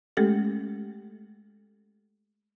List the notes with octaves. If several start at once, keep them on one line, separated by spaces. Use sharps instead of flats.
G#3 A3 C#4 G4 A4